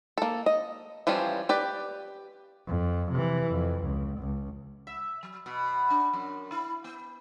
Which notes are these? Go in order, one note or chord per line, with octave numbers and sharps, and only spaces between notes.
A#3 A4
D#5
E3 F3 G3 C#4 F4
G4 B4 D5
F2
C3 E3
F2
C#2
C#2
E5
F#3
B2
D4
F#2
E4
B3